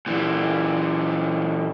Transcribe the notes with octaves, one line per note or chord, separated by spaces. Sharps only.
A#2 E3